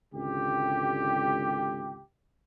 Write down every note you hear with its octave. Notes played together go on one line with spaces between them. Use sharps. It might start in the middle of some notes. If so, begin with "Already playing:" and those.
G#1 C#2 D3 G4